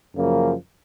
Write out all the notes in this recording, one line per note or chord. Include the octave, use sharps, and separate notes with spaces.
F#2 C#3 F3 A#3